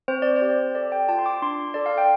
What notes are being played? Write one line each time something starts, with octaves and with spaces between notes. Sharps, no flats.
C4 C5
D5
C5
G4
A4 D5
G5
F4 A5
C6
D6
D4 C6
A4 D5
F5
G5